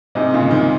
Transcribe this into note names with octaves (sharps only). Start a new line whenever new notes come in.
G#2 C3 D#4
A#2 C#3
G#3
C3 D#3